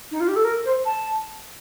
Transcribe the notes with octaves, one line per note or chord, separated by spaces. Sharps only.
D#4
F4
G4
A4
A#4
C5
A5